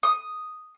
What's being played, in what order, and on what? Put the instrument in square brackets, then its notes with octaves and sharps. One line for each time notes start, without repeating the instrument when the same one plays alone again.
[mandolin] D#6